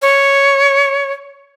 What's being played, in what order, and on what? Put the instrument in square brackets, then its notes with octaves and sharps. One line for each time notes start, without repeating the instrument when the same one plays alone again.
[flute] C#5